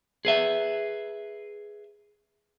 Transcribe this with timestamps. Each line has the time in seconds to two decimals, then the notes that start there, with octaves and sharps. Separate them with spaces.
0.25 G#4 B4 E5